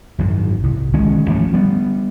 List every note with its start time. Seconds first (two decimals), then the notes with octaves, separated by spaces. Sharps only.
0.18 G#1 F#2
0.63 C2
0.93 D1 D#3 G#3 C#4
1.30 G1 F3 A3 C#4
1.54 G3 B3